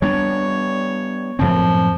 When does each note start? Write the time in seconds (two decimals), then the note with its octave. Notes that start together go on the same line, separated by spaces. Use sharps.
0.02 G3 B3 D4 C#5
1.39 F#2 A2 F3 C4